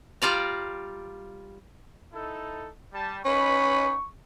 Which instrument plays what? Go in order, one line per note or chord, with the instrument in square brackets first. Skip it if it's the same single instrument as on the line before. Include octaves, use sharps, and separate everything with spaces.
[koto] G3 F4 D5 A#5
[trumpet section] D#4 E4 A4
G3 A5
[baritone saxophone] C#4 [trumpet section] D#4 B4 B5 [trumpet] C#6